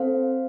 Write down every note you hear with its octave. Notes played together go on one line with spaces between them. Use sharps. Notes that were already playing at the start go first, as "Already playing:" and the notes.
Already playing: C4 A4 C5 F5